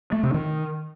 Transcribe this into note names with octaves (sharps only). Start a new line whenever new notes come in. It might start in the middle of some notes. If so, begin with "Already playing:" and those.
A3
C3
D#3